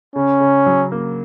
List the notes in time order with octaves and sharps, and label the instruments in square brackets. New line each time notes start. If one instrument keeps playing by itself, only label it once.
[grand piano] C#3 [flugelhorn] C#4
[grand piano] C#3
F#3
A#3